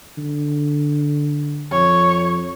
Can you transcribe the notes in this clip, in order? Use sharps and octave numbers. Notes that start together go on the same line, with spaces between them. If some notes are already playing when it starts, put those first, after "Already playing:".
D3
F2 C#5